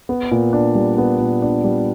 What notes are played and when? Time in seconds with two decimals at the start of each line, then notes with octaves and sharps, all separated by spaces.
0.09 B3
0.31 A#2
0.53 D4
0.75 G3
0.98 B3
1.20 A#2
1.42 D4
1.64 G3